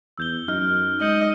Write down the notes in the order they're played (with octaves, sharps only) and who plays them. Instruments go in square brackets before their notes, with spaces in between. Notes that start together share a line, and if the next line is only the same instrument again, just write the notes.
[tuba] E2 [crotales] E6 G6 G7
[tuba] F#2 [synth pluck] D#4 [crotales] F6
[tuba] G#3 [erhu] D#5 [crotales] G6 C#7 F#7